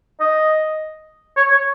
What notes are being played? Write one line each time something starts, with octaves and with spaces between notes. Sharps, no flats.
D#5
C#5
C#5